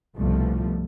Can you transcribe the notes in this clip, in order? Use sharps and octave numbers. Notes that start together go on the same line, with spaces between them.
C2 G2 B2 F3 A3